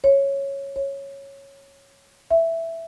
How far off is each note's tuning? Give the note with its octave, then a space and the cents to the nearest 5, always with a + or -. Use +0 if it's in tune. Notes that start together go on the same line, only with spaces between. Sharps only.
C#5 -5
C#5 -5
E5 +5